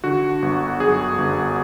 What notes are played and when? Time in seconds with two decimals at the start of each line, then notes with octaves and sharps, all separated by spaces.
0.04 D3 F#4
0.42 G1
0.80 F#2 G#4
1.18 G1